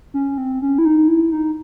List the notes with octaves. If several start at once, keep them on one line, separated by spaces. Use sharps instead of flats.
C#4
C4
C#4
E4
D#4
E4
D#4